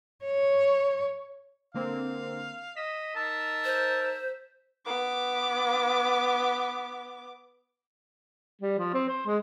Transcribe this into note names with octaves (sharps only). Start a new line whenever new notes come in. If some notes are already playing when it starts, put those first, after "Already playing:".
C#5
D3 A#3 C4 F5
D#5 B6 E7
D#4 A#4 A5 E6
C5
B3 D6
G3
F3
C4
C5
G#3